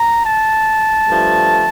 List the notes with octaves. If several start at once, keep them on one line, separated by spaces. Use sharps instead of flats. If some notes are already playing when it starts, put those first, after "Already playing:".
Already playing: A#5
A5
G2 F3 A3